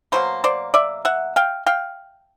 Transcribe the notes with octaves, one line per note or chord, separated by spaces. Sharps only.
B2 F#3 A#3 C5
C5 D5
D5 E5
E5 F#5
F5 G5
F5 G5